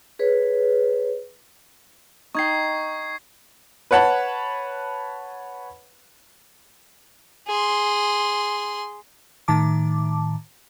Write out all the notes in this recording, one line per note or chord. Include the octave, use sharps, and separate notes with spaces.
G#4 B4 C#5
D#4 G5 C#6 G#6 C7
B4 C#5 F#5 A5 B5
G#4 C6
A2 D#3 A5 D6